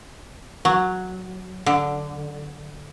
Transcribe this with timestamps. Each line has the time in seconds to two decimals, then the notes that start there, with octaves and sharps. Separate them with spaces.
0.65 F#3
1.66 D3